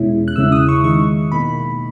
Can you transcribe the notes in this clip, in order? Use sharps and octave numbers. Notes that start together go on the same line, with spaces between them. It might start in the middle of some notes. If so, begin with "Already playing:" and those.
Already playing: E2 B2 G#3 C#4 E4
F#6
E2 C#3 G#3 C#4 E4 E6
D#6
C#6
D#3 G#3 D#4 C#6
B2 A#3 D#4 B5